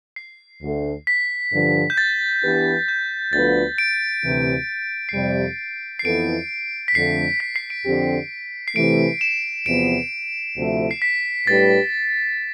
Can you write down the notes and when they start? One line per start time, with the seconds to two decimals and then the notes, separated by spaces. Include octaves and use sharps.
0.16 C7
0.62 D2 D3 A3
1.07 B6
1.53 G2 D3 F3
1.90 G6
1.98 A6
2.43 E3 B3 D4 G4 B4
2.88 G6
3.33 D2 D3 F3 B3 F4 A6
3.78 D7
4.24 D2 C3 E3
5.09 C7
5.14 F2 C3 G3 D7
5.99 C7
6.05 F2 E3 B3 E4 A4 D7
6.88 B6
6.95 F2 D3 A3 C7
7.40 B6
7.56 C7
7.70 D7
7.85 F2 D3 F3 C4 G4
8.68 C7
8.76 C3 E3 A3 D7
9.21 E7
9.66 E2 C3 F3 B3 D7
10.57 D2 C3 F3 A3 E4
10.91 C7
11.02 B6
11.47 A2 G3 D4 G4 B4 A6